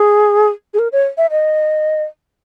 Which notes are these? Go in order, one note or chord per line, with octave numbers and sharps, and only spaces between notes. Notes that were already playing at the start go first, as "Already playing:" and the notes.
Already playing: G#4
G#4
A#4
C#5
E5
D#5